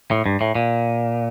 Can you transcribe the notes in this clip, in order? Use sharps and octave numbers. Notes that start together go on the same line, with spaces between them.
A2
G2
A2
A#2